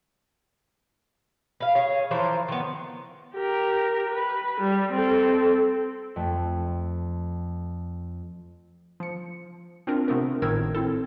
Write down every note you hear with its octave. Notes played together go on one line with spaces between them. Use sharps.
B4 F5
G#4 C#5
E3 F3 A#4 C5
D#3 B3
G4 A#4
B4
G3
C4 A4
F2 A3
F3 C#7
C4 D4 F4 A#4
C3 A3 B3 A#4
G#1 A2 D#3 A#4 E6 G#6
C4 E4 A4